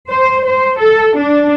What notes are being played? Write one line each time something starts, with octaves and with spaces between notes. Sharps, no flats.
C5
C5
A4
D4